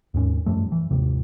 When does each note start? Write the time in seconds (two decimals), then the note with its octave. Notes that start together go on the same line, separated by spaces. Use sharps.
0.14 D#2 G#2 C#4
0.46 F#2 F3 G3 A3
0.72 E3
0.91 G#1 D#2 C3